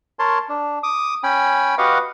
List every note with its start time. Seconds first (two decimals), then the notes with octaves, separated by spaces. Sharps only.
0.19 A#4 C#5 A5 C6
0.49 D4
0.83 D6 D#6
1.23 C#4 G5 G#5 B5
1.78 F#4 G4 B4 D#5 F5 F#5